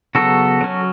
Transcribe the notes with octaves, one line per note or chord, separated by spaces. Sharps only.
C#3 F#3 B3 F#4 A4
F#3 C#4